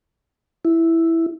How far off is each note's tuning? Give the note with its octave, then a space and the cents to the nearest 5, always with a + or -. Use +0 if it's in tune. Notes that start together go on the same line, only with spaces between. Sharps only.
E4 +0